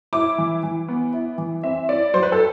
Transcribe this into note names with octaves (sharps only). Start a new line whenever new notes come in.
E4 D6
E3
E3
B3
E4
E3
C4 E5
E4 D5
F#3 C5
B4
A4